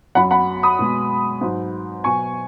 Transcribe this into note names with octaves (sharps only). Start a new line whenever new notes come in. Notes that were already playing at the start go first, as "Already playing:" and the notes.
F#2 F#3 F#5 B5
F#5 B5
B5 D#6
B2 G#3
G#2 F#3
B2 F#3 G#5 C#6